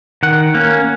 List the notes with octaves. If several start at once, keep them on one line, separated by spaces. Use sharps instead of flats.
D#3 F#5
A#3 C#4